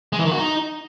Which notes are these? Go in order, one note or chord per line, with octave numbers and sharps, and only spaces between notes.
G#3
E3
D#3
F#4
D#4